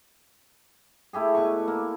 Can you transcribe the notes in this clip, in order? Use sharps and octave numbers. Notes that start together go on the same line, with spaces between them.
A3 E4 G4 G#4
B2 B4 A5 C#6
A#3